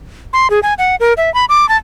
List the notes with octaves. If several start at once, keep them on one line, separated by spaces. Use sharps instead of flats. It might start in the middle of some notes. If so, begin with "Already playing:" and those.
C6
G#4
G#5
F#5
A#4
E5
B5
D6
A5